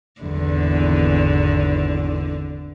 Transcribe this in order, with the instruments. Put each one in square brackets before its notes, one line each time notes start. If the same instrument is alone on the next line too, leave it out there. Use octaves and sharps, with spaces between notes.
[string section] G#1 E2 [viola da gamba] D3